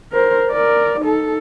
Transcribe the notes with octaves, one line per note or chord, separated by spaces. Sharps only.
A#4 C5
A#4 D5
D#4 A4